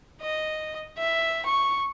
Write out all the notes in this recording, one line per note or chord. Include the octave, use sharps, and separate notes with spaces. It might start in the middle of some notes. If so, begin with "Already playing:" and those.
D#5
E5
C#6